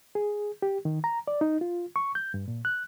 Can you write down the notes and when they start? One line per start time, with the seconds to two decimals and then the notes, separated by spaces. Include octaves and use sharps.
0.15 G#4
0.62 G4
0.85 D#3
1.04 A#5
1.28 D5
1.41 D#4
1.61 F4
1.96 C#6
2.15 G6
2.34 G2
2.48 A#2
2.65 F#6